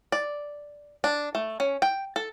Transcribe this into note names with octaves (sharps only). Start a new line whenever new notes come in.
D5
D4
A3
C#4
G5
A4